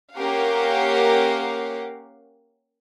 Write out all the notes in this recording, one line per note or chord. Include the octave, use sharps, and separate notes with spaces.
A#3 C#4 G4 A#4 F5 F#5